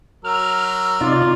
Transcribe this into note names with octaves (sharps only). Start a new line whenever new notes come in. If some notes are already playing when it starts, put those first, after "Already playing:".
F#3 A#4 E6 F6
C3 D#4 F4 D5